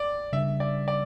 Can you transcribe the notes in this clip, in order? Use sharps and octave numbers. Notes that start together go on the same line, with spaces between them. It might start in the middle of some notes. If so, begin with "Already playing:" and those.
Already playing: D5
C#3 G3 D4 E5
D5
D5